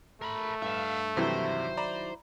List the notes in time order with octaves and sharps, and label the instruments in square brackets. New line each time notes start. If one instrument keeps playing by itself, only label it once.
[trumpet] A3 [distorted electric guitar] A#4 B5
[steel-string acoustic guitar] G2 [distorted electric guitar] E5 F5
[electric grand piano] G2 C3 E3 [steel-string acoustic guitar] D#3 F#3 E4 [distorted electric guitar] C5
[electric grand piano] D5 A#5 B5